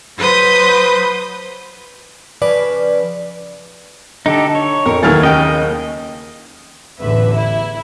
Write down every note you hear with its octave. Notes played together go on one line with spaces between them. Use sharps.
F#3 B4 C5 D#6 G6
C#3 F3 B4 D5
D3 D#4 G4 A4
C#5
F2 A#4
D#2 E3 F#3 A3 F6 A6
C#3 D#5 G5
A1 E2 D3 B4 E5
E4